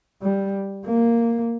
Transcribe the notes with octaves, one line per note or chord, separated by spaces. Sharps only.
G3
A#3